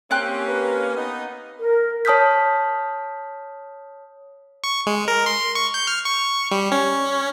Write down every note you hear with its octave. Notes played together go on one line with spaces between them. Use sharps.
A#3 C4 C#4 G4 F#6
B4
B3 D#4
A#4
C#5 A5 D#6 F6 G6 B6
C#6
G#3
A#4
C6
C#6
G6
F6
C#6
G3
C#4